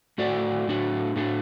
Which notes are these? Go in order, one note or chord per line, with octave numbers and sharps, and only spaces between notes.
A2 A3 F#4 D5
A2 A3 D4 F#4
A2 A3 D4 F#4